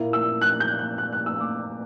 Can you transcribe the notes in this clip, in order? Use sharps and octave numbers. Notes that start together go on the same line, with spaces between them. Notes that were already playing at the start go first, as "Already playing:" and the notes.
Already playing: A#2 A#3 E4
E6
F#6
G6
F#6
F#6
F#6
E6
D6